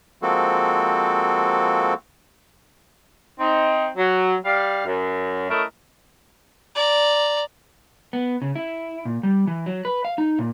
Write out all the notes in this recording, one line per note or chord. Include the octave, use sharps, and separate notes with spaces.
F3 G#3 A#3 C4 F#4 A4
C4 D#4
F#3
G3 F5
F#2
A3 C#4 E4 A#4 D#5
D5 A#5
B3
C#3
E4
A#2
G3
E3
F#3
B4
F5
D#4
A#2